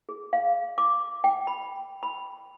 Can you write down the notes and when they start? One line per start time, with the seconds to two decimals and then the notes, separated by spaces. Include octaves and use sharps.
0.09 G#4
0.33 F5
0.78 D6
1.24 G5
1.47 B5
2.03 B5